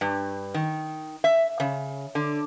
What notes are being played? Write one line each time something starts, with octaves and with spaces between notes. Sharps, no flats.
G2
D#3
E5
C#3
D3